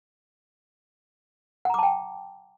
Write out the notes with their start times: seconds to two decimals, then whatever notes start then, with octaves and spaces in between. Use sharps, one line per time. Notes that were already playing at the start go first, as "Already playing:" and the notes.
1.65 F#5
1.70 A#5
1.74 D6
1.78 A5
1.83 G5